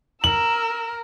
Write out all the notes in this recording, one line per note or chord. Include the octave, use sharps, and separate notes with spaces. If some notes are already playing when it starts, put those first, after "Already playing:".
A#4 E6 F#7